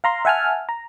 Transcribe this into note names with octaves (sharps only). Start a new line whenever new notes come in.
F5 A#5 C6
E5 F#5 G#5 A5 F6
A#5